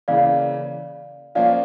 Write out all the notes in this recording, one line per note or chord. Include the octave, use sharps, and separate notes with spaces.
C#3 E3 A#3 D5 F5
F3 A#3 C#4 F4 D5 F5